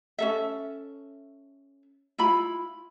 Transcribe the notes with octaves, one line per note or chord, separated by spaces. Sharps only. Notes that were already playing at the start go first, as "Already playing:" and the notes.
C#4 A4 E5
E4 F4 B5